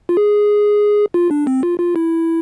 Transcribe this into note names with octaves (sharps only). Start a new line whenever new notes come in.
F4
G#4
F4
D4
C4
F4
F4
E4